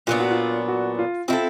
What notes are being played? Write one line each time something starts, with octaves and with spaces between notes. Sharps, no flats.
A#2 F#3 B3 D4 F4
F#4
F4
F#4
F4
C4 E4 F4 A4